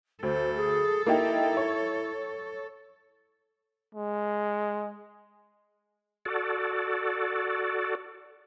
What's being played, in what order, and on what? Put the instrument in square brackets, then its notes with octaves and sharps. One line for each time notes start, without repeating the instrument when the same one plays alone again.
[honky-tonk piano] D2 [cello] A4 [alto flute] C5
[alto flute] G#4
[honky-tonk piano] A#3 D#4 G4 [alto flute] E4
[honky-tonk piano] C#5
[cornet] G#3
[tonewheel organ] F#4 A4 D5